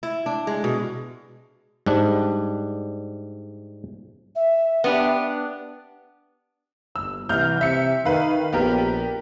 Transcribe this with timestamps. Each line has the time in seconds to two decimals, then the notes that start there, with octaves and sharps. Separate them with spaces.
0.03 E4
0.26 D4
0.47 G#3
0.64 B2
1.86 G#2 G3 D4
4.35 E5
4.84 B3 D4 G4
6.96 G1 E6
7.29 C2 E3 F6 G6
7.61 C3 E5 C#7
8.05 D#3 B4 F5
8.53 A#1 B3 G4 A#4